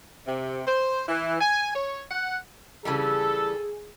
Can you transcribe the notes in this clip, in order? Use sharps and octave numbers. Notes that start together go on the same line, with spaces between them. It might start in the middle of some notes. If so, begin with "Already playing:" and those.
C3
C5
E3
G#5
C#5
F#5
C#3 E3 G3 G#4 A4